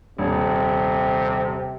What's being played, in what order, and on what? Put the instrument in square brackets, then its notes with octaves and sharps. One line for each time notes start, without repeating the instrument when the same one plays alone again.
[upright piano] D#1 [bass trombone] C3